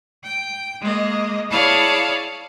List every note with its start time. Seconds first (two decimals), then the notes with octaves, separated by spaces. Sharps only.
0.23 G5
0.81 G#3 A#3 D#5
1.50 E4 G#4 C#5 D5 F5 A5